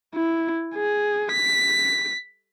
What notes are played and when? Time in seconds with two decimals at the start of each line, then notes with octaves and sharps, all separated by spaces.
0.14 E4
0.75 G#4
1.32 B6